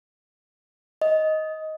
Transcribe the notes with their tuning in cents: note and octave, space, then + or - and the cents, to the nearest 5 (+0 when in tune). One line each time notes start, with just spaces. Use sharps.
D#5 +10